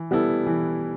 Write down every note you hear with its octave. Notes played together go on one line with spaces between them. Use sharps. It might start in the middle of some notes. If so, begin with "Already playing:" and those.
Already playing: E3
G3 B3 E4 A4
E3